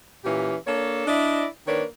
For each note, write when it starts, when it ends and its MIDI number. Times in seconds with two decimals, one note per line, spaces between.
0.24 0.56 46
0.24 0.56 52
0.24 0.56 61
0.24 0.56 67
0.67 1.05 58
0.67 1.05 62
0.67 1.05 69
0.67 1.05 73
1.07 1.45 62
1.07 1.45 64
1.07 1.45 74
1.07 1.45 75
1.67 1.84 51
1.67 1.84 58
1.67 1.84 62
1.67 1.84 71
1.67 1.84 73